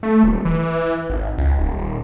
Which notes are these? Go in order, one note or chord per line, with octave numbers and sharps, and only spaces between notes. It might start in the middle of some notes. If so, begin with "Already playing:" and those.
A3
D#1
E3
G#1
C#2
D#1
D#1